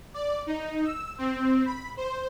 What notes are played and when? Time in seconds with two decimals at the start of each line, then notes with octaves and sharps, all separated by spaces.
0.14 D5
0.47 D#4
0.84 E6
1.18 C4
1.66 B5
1.97 C5